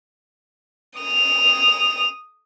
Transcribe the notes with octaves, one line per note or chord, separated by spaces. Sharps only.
D#6 F7